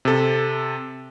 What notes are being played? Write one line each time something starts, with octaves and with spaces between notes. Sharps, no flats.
C3 A4